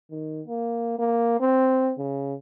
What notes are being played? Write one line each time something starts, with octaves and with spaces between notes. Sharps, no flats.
D#3
A#3
A#3
C4
C#3